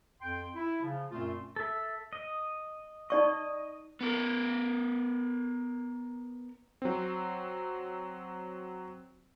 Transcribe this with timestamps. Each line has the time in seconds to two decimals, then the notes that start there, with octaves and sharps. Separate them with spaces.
0.21 F2 G5 C6
0.56 E4
0.82 C#3 F3
1.11 F#2 A#2 A3 C4 F4 C6
1.56 A4 E5
2.13 D#5
3.10 D#4 D5 D#5 C#6
4.01 B3 A#4
6.82 F#3 C4